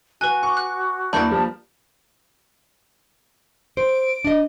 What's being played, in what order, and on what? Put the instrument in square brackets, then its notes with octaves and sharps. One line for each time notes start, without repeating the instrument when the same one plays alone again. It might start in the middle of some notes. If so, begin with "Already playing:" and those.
[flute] F#4 [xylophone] B4 G#5 [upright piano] F#6
[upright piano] C#6 D6
[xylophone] F#6
[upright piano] E2 E3 A#3 [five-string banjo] D4 D5 [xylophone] B5 G6
[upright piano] F3 G3 A#3 [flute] A5
[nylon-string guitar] C5 [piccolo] D7
[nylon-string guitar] D4 D#5